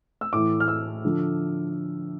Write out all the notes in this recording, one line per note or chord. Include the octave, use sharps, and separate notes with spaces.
E6
A2 E3 D6
F6
E6
D3 F3